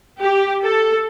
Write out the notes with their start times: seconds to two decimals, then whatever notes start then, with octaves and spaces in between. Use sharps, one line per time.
0.20 G4
0.62 A4